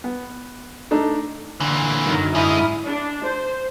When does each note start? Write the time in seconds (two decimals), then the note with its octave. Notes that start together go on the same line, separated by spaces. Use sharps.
0.04 B3
0.91 A3 D4 D#4 A4
1.60 A#2 D3 E3
2.04 F#2 D#3 F#3
2.35 G#2 E4 D#6 F6
2.86 D4
3.25 C5